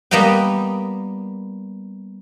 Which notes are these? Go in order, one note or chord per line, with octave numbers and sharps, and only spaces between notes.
G3 A#3 B3 D#5 G5